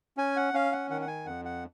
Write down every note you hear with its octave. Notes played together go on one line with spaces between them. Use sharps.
C#4 G#5
F#5
C#4 F5
F#5
D#3 F#5
F#5
G#5
F2 F#5
F#5